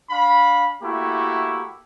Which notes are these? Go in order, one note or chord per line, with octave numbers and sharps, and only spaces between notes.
D4 F5 B5
A3 A#3 E4 F#4 G4